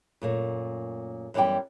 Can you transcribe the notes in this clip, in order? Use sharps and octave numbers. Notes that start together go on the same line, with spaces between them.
F#2 A#2 A3
F#2 E3 G3 B3 G5